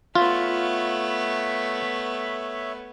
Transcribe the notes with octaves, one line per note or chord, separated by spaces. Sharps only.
A3 B3 F4 C#5 E5